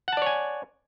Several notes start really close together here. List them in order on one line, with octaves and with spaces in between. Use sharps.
F#5 A5 D5 C#5 G#5